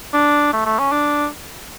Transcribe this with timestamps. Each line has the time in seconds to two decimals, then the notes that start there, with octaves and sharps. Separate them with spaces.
0.13 D4
0.53 A3
0.65 A3
0.79 C#4
0.92 D4